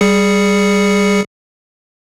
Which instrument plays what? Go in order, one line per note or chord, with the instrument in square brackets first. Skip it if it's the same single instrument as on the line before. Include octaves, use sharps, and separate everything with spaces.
[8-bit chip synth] G3 G#4 C#7